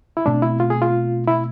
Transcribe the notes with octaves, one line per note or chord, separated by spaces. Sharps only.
E4
B2 A3 C4 D4
E4
F4
G#4
F4
E4